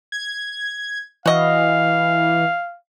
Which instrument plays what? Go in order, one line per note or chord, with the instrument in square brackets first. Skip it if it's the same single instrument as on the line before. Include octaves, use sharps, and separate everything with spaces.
[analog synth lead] G#6
[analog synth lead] E3 [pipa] F#4 D#5 [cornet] F5